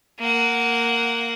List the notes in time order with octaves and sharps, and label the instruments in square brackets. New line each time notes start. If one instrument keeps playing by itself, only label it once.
[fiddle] A#3 F#5